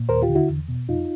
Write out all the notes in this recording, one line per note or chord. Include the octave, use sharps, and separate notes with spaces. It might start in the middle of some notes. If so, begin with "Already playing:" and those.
Already playing: A#2
D#2 A#4 C5
F4 G4
D3
E4 F#4
E2
B2
F2 D#4 F4